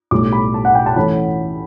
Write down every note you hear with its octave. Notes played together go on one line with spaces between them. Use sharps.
B1 A2 G3 D6
B5
A5
F#5
G5
A5
E3 A3 C#4 B5